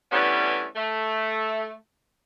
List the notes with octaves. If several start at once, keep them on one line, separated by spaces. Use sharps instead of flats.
E3 G3 A3 B3 C#4 D4
A3